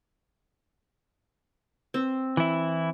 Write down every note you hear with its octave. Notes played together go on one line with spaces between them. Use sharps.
C4
E3 E4